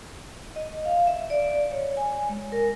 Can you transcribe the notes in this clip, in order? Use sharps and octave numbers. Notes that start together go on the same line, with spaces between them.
D#5
F5
E5
D5
C#5
G#5
G#3
A#4